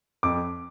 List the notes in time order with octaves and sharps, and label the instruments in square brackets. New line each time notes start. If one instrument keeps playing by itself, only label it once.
[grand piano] F2 D6